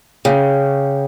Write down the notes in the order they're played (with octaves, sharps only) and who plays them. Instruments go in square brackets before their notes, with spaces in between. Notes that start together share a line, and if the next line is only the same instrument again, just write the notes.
[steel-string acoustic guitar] C#3 [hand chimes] G#4 C#5 G5